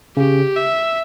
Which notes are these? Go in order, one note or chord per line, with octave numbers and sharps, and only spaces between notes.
C#3 G4
E5